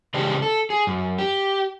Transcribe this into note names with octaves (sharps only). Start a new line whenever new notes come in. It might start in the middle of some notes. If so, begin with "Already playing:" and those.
C#3 E3 G#3 D4 G4
A4
G#4
F#2
G4